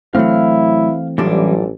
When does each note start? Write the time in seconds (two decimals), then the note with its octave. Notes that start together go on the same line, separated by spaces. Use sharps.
0.15 A2 E3 F#3 A3 C4 E4 F5 F6
1.18 A1 F#2 A#2 E3 G3 D4